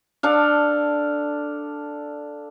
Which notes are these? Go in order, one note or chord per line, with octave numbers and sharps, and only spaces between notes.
D4 A4 F5